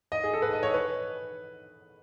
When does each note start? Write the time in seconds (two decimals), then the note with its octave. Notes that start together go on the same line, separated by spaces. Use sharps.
0.12 D#5
0.24 G#4
0.34 A4
0.42 B4
0.53 D#5
0.63 C#5
0.74 B4